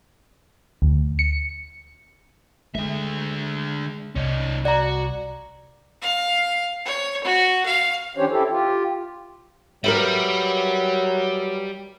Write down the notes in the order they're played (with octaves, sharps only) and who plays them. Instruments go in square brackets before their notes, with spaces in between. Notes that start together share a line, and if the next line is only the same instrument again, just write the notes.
[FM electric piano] D2
C#7
[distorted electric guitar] D3 E5 [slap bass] G#3
[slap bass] C2 [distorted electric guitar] C#4 D#4
[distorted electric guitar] F#4 [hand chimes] D5 A#5
[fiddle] F5
C#5
F#4
F5
[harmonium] E3 C#4 D4 G4 C5 C#5
E4 G4 A4
F4 G4
[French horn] F#3 [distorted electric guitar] G3 [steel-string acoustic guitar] A#4 B4 E5